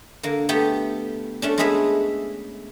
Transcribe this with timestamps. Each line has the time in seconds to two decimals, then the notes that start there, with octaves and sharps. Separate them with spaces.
0.23 D3 A#3
0.49 A3 B3 G4
1.42 A3 C#4 D4
1.58 G#3 A3 B3 G#4 B4 E5